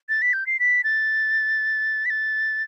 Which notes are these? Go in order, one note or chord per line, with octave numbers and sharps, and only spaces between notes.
A6
B6
G6
C7
B6
A6
B6
A6